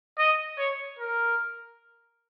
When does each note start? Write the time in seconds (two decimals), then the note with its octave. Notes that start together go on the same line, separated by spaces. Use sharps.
0.18 D#5
0.58 C#5
0.99 A#4